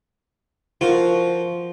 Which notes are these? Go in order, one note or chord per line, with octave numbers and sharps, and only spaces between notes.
F3 F4 F#4 A#4